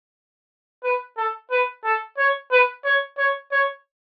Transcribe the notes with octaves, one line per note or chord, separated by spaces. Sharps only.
B4
A4
B4
A4
C#5
B4
C#5
C#5
C#5